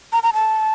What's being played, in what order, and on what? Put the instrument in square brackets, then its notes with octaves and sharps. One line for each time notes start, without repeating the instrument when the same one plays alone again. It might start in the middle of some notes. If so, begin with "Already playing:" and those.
[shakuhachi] A#5
A#5
A5